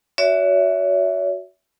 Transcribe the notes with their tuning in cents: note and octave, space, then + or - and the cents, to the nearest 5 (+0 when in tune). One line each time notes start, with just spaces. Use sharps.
F#4 +5 C#5 +40 E5 +0